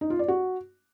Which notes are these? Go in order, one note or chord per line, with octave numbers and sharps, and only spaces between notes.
D#4
F4
D5
F#4